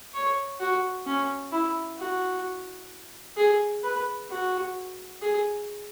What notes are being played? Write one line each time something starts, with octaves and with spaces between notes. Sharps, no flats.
C#5
F#4
C#4
E4
F#4
G#4
B4
F#4
G#4